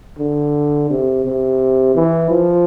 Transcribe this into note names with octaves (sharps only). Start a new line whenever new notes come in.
D3
C3
C3
E3
F3